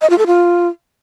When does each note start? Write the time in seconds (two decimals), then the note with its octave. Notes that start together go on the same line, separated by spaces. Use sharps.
0.02 D#5
0.10 F4
0.18 A4
0.27 F4